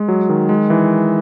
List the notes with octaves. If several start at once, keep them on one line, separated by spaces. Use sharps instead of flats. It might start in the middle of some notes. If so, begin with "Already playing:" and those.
Already playing: G#3
F#3
D#3
G#3
E3